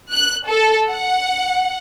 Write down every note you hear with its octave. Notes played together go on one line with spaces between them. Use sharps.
F#6
A4
F#5